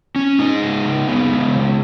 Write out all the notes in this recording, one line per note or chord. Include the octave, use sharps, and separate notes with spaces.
C#4
G#3 D#4
C#3
C#3
B3
G#3
C#3